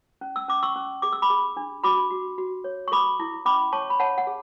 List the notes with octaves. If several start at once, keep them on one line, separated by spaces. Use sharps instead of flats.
C#4
E6
C#4 D6
C#6 E6
C#4
G#4 D6
E6
B5 D6
G#4
D4
F#4 B5 D6
F#4
F#4
C#5
C#6
A4 B5 D6
E4
C#4 B5 D6
C#5 A5 C#6
B5
C#5 F#5 A5
F#5
G#4